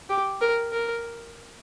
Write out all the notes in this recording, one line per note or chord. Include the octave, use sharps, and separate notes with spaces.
G4
A#4
A#4